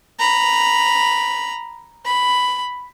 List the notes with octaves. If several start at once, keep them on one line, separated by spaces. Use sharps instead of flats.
A#5 B5
B5